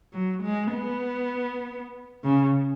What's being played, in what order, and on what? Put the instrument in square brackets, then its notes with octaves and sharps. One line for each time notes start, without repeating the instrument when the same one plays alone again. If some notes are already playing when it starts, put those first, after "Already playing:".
[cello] F#3
G#3
B3
C#3